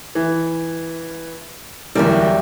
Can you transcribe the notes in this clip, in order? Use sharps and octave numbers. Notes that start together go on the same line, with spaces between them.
E3
D1 E2 G3 A#4 E5